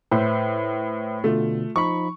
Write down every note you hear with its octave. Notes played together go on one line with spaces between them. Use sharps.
A2 B4 C5 E5
B2 D3 A3 F4
F3 D#4 B5 C#6